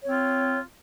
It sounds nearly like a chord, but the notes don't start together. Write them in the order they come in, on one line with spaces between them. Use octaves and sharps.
C#5 C4 F4